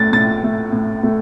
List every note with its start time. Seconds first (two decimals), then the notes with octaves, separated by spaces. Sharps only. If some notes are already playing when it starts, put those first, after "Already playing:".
Already playing: A2 A3 A6
0.12 A2 A6
0.43 A3
0.72 A2
1.03 A3